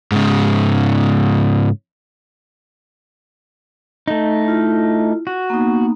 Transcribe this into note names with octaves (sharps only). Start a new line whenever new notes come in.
G#2 C#3
A3 D#4
E4 F4
F#4
A#3 B3 D#4